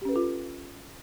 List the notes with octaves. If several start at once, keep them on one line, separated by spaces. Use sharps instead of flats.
C#4 F4 G4 A4 B4